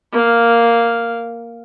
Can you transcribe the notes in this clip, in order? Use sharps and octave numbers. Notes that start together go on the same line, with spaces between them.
A#3 F5